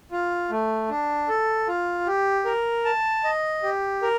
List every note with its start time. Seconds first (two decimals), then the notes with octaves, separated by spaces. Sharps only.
0.12 F4
0.51 A3
0.90 D4
1.29 A4
1.68 F4
2.07 G4
2.45 A#4
2.85 A5
3.24 D#5
3.63 G4
4.02 A#4